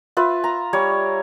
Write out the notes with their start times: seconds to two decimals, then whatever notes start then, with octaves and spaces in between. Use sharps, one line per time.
0.17 F4 B4 E5
0.44 A#5
0.73 G3 C#5 D5